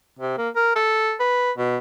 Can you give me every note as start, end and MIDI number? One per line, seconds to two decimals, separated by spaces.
0.19 0.38 48
0.38 0.49 58
0.56 0.71 70
0.76 1.14 69
1.20 1.52 71
1.58 1.78 47